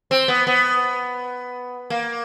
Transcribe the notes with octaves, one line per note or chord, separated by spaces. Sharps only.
C4
B3
B3
A#3